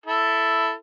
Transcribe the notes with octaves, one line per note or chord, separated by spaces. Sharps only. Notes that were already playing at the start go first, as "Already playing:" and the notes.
E4 A4